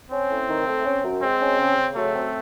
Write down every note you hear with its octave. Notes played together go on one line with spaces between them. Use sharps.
C4 C#4
A2
D#3
A3
C#4
F#2
G#3 C4
C#4
C#3
C#3
F#3 A3
C4